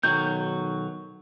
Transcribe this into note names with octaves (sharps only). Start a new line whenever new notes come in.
B1 D#3 F#3 G6